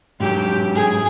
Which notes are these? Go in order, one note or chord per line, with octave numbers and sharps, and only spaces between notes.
G#2 F#3 G4
G#4